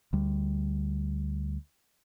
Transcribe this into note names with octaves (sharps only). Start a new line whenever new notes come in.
D2 G3